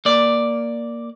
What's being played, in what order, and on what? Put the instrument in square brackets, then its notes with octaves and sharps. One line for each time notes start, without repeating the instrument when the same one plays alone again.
[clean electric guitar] A#3 D5